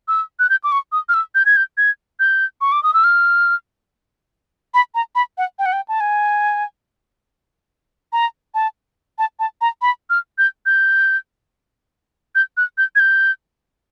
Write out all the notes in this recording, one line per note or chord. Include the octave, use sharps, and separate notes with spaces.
E6
F#6
G6
D6
C#6
D#6
F6
E6
G6
G#6
G6
G#6
G6
C#6
D6
D#6
E6
F6
B5
A#5
B5
F#5
G5
F#5
G5
A5
G#5
A#5
A5
A5
A5
A#5
B5
F6
G6
G6
G6
F#6
G6
G#6
G6